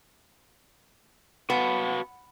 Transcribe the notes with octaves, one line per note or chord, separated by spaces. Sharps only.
B3 F#4 F5 A5